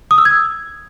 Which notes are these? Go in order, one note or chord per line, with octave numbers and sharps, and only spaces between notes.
D#6
E6
G#6